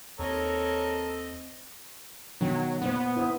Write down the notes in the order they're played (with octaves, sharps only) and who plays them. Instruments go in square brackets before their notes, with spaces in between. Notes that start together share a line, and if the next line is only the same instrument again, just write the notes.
[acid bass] D#2 [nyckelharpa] C4 D#5 [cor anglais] A4 [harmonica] A#4 C#5
[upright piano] B2 D#3 [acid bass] F#3
[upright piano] A#2 C5 [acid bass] B3
[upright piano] E4 C5 D#6